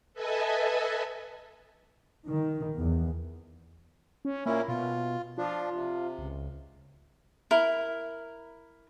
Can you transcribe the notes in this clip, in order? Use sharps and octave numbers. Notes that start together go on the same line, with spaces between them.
A4 B4 D#5 E5 G#5 A5
D#3
E2
C#4
A#2 A#3 C#4 E4
B2 F4
F3 D4 F4
C3
C#2
E4 A#4